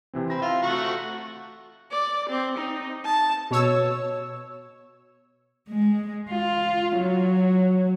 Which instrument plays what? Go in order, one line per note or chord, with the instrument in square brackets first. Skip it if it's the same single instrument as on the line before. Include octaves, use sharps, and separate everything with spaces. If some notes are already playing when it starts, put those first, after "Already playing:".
[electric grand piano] C3 E3 C4
[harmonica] C4 [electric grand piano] B5 A#6
[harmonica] F4 [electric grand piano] E5 F5 A#5
[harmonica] A3 F#4 F#5
[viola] D5
C4
D#4
A5
[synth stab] B2 C#5 E6
[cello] G#3
F4
F#3